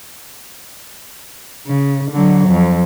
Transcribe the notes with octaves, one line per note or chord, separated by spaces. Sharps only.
C#3
D3 F#3
F2